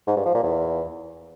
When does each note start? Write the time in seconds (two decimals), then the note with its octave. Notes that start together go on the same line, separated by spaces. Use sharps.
0.07 G#2
0.16 G2
0.25 F3
0.34 A#2
0.43 E2